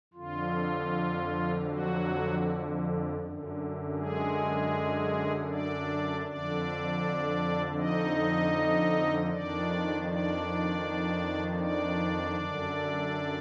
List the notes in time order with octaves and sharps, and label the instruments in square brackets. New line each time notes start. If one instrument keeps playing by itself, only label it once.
[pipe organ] F2 D3 F4
F#3 F#4
F#2 D3
G#3 G#4
D4 D5
F2 D3 D4 D5
D#4 D#5
F2 D#3 D4 D5
D4 D5
D4 D5
F#2 D3